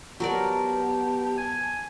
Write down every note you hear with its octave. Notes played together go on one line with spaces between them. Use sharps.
F#3 B3 G4 A#4 D5 A5
G#5